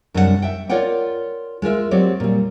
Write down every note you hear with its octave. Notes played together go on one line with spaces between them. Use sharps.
F#2 C3 G3 D4 G#4 F#5
E5 G5
F4 A#4 C#5 D5 F#5 G5
G#3 F4 A#4 E5
F#3 C4 G4 C#5 D5
A#2 G3